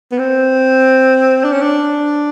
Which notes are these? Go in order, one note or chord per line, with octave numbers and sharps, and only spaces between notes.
B3
C4
D4
C#4
D4